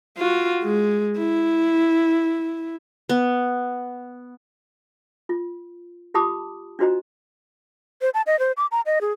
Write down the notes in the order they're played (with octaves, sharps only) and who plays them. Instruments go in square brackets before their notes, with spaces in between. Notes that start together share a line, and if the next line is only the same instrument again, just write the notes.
[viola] F4 F#4
G#3
E4
[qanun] B3
[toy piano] F4
F4 G4 A5 B5 D6 D#6
D4 F4 F#4 C5 D#5 A#5
[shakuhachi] C5
A5
D#5
C5
D6
A#5
D#5
G#4